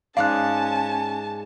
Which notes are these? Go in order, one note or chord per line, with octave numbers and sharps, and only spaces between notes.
G#2 C#4 D5 F5 G#5 A5 F#6